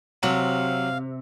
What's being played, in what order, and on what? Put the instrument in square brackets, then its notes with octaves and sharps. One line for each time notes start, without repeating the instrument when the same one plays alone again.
[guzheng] C3 [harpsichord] F#3 [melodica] F5